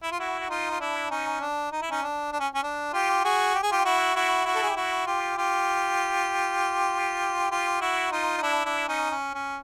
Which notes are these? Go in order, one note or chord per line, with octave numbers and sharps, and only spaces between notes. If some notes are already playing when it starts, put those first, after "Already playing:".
E4
F4
E4 F#4
F#4
D#4 F4
F4
D4 E4
C#4 D#4
D4
D#4
E4
C#4 D#4
D4
D4
C#4
C#4
D4
F4 G4
F#4 G#4
G4
G#4
F4 G4
E4 F#4
E4 F#4
E4 F#4
A4
G#4
G4
E4 F#4
F4 G4
F4 G4
F4 G4
E4 F#4
D#4 F4
D#4
D4 E4
D4 E4
C#4 D#4
C#4
C#4